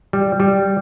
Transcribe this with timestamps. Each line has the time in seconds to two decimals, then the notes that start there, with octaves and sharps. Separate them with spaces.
0.13 G3
0.40 G3